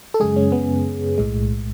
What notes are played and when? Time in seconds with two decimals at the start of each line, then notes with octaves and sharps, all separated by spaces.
0.14 A4
0.20 F#2 C#3 G#3 G#4
0.36 C#4
0.52 B3
1.18 B1 A2 G#3